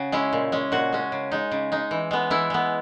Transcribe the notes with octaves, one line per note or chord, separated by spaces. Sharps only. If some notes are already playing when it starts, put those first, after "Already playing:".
Already playing: C#3 F#4
G#3 C#4 E4
A#2
G#3 C#4
A#2 F#4
G#3 C#4
C#3
G#3 D#4
C#3
G#3 D#4
E3
G#3 B3
E3 E4
G#3 B3